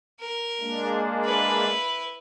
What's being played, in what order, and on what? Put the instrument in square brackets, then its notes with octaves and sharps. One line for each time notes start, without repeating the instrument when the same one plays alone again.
[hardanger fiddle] A#4
[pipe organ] G#3 A#3 D4
[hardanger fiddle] E4 B4